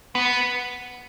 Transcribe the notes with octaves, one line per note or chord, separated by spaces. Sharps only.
B3